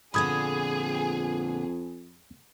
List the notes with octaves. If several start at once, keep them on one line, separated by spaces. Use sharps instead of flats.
F2 A#2 D3 B3 G#4 B5 D#6 G#6